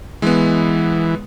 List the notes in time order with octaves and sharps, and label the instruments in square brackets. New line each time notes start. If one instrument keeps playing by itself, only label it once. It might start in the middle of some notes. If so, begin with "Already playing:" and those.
[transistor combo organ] E3 [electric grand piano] G#3 B3